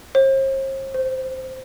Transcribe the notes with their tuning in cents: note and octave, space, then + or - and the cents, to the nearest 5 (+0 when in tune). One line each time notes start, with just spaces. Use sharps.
C5 +45
C5 -5